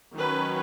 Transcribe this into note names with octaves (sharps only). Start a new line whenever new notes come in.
D#3 F#3 C#4 B4